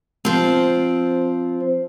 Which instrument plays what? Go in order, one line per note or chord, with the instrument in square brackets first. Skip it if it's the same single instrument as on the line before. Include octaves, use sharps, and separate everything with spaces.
[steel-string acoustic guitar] F3 C4